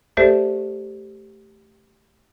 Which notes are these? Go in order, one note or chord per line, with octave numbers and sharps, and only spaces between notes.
A3 G4 A4 C5 D5 E5